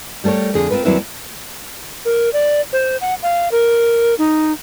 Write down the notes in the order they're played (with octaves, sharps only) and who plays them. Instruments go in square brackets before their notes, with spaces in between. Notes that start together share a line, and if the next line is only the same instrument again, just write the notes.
[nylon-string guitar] G3 A3 A4 A#4 C#5
F2 D3 G#4
C4 F4 A#4 B4
D#2 F#3 G3 C4 E4 B4
[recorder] A#4
D5
C5
F#5
F5
A#4
D#4